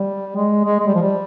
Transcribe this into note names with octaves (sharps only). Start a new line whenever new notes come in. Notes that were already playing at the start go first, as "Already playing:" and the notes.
Already playing: G3
G#3
G#3
G#3
G3
F3
G3